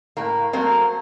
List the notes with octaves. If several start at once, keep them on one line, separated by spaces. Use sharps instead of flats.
A2 A#3
F#3 A3 A#3 C4